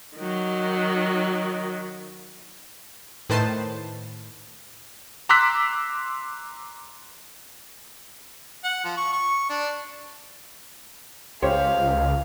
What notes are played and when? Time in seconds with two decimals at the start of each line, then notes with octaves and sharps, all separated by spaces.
0.17 D#3 F#3
3.29 A2 D#3 B4 C5 A5 C7
5.29 A#5 C6 D6 E6 F#6 B6
8.63 F#5
8.84 F3
8.97 C#6
9.13 C#6
9.49 D4
11.42 C#2 G4 C5 C#5 F5